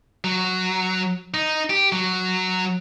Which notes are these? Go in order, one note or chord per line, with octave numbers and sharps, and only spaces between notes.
F#3
D#4
G4
F#3